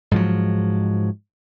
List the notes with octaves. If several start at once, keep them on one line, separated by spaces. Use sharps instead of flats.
G#2 F3 F#3